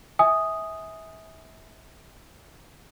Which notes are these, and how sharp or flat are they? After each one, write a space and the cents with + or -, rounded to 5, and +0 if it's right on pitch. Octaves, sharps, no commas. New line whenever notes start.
E5 -30 G#5 +0 D#6 +0